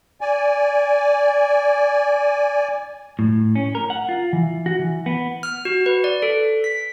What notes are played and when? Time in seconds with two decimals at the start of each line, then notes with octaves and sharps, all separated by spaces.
0.21 D5 G#5
3.19 A2
3.55 C#4
3.75 A#4
3.90 F#5
4.09 F4
4.33 E3
4.66 F#4
4.79 E3
5.06 B3
5.43 F6
5.65 F#4
5.86 B4
6.04 D5
6.22 A4
6.64 B6